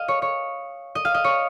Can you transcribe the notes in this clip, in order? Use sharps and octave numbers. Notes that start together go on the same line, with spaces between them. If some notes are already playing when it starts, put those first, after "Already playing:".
Already playing: D#5 F5
C#5
C#5
D#5
F5
D#5
C#5